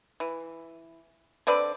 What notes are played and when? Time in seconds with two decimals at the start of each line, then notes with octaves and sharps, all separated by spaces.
0.20 E3
1.47 D3 C4 B4 D5